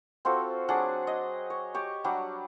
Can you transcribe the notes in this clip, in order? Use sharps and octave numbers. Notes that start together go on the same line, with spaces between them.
C4 F4 F#4 A4
F#3 D4 G#4 F#5
D#5
C#5
G4 C#5
F#3 G3 D4 F#5